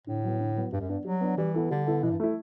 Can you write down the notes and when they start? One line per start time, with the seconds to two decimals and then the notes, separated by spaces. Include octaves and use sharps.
0.07 A2 D3
0.24 F#3 B3
0.40 D3
0.56 F#3 B3
0.72 G2 G3
0.81 F#2
0.89 G2 B3 D4
1.05 F#3 G3
1.21 B3 D4
1.37 E3 G3
1.54 B3 E4 A4
1.70 D3 G3
1.87 B3 E4 A4
2.03 B2 E3
2.11 G2
2.20 A3 E4